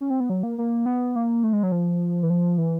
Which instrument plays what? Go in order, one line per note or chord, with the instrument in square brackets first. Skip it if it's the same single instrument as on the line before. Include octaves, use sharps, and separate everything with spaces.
[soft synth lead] C#4
C4
B3
F#3
A#3
A#3
B3
A#3
A3
G#3
F#3
F3
E3
F3
E3